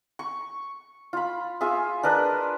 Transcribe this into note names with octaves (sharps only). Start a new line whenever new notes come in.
C#6
F4 B5
F4 G#4 E5
D4 A#4 B4 D#5